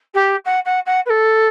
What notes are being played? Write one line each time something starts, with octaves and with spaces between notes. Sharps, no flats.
G4
F#5
F#5
F#5
B4
A4